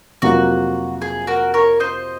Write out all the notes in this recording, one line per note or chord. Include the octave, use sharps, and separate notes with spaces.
F2 C3 F#3 A#3 F4 F#4
G#4
F#4 A#4
A#4 C#5
C5 D#5